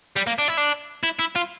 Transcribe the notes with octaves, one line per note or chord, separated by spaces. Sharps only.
G3
A#3
D4
E4
D4
E4
E4
F4